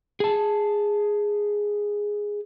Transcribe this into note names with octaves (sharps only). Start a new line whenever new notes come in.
G#4 A5